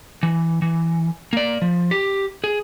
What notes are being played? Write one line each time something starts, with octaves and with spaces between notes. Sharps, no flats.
E3
E3
A#3 D5
F3
G4
G#4